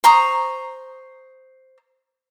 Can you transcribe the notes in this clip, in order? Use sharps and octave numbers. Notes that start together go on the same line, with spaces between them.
C5 A#5 C#6 D#6